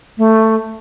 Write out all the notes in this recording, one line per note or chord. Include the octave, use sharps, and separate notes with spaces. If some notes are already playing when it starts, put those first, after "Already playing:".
A3